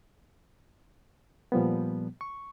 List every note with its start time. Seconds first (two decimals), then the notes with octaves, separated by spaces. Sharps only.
1.52 A#2 F3 G3 B3
2.21 C#6